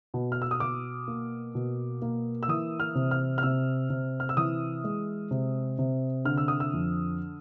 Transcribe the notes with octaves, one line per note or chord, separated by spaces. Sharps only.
B2
F6
E6
D#6
B2 D6
A#3
B2
A#3
E6
E3 D#6
F6
C3
F6
F6
C3 E6
C3
F6
E6
E3 D#6
G#3
C3
C3
D3 F6
E6
D#6
E6
F2